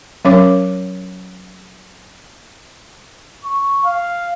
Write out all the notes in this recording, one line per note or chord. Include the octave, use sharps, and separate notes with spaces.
F#3 C#4 A#4 C#5 D6
C#6
F5